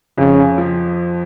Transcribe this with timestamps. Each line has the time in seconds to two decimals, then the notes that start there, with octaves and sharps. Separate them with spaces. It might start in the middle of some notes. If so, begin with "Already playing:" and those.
0.18 F2 C#3
0.58 F3